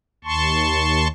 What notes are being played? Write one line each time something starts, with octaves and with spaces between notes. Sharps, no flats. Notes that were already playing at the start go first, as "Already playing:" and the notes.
D#2 A5 C6 C#6